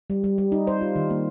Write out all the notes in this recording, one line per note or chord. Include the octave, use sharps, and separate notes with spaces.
G3
G3
G3
D#4
C5
F4
D#3
A#3